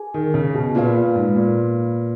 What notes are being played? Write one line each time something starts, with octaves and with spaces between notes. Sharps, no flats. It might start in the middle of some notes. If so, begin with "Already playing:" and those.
Already playing: G#4 G#5
D#3
C#3
B2
A#2 F4 B4 F5
A#2
G#2
A#2